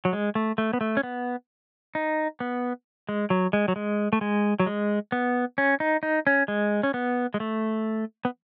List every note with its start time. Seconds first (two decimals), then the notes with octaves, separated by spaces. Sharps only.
0.05 F#3
0.13 G#3
0.35 A3
0.58 A3
0.73 B3
0.81 A3
0.97 C#4
1.03 B3
1.95 D#4
2.40 B3
3.09 G#3
3.30 F#3
3.53 G#3
3.68 F#3
3.76 G#3
4.13 A3
4.21 G#3
4.60 F#3
4.66 G#3
5.12 B3
5.58 C#4
5.80 D#4
6.03 D#4
6.27 C#4
6.48 G#3
6.83 C#4
6.94 B3
7.34 G#3
7.40 A3
8.25 B3